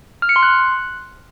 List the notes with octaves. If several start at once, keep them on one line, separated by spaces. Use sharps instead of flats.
F6
C#7
C6
F#6